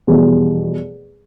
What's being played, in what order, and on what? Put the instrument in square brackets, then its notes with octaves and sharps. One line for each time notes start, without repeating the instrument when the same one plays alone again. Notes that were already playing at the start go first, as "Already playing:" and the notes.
[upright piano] F1 E2 B2 G3